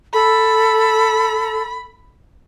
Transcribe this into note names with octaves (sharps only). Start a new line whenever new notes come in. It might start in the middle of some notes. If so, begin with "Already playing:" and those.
A4 B5